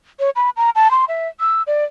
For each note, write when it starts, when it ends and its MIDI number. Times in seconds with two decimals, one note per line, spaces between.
0.20 0.30 73
0.36 0.50 83
0.57 0.70 82
0.75 0.91 81
0.91 1.05 84
1.08 1.28 76
1.40 1.62 88
1.67 1.84 74